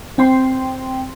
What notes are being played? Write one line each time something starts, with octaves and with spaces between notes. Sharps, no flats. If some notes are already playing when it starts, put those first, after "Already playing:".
C4 G5 C6